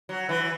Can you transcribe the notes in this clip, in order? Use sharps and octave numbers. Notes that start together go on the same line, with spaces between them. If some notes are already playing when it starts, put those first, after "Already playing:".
F#3
E3